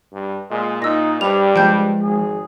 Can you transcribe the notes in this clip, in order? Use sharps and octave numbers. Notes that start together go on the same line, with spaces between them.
G2
A#2 G#3
A#2 D#4 E6 A#6
G2 G3 C5 F7
F3 G#3 G5 A5 G6
G#1 G#4